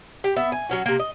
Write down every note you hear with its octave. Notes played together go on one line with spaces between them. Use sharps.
G4
B3 E5
G#5
F#3 C#4 F#4
C3 A#3
D#5